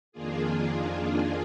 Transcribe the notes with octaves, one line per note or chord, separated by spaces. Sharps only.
F2 D#3 A#3 D4 F4 G#4